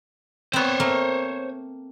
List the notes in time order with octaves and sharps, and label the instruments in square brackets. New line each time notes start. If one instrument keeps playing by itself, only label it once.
[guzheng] B3 C4 [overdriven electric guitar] C5 C#5
[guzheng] A3 A#3